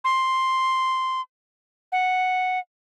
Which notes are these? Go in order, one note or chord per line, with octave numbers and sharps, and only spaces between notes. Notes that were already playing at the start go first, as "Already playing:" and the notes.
C6
F#5